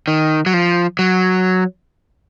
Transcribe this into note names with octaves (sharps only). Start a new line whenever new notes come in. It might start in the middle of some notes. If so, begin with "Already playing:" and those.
D#3
F#3
F3
F#3